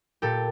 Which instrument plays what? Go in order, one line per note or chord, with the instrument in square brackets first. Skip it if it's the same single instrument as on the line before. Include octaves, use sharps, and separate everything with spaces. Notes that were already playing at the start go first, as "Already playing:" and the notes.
[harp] A#2 G4 A4